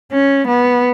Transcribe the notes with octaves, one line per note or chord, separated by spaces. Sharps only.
C#4
B3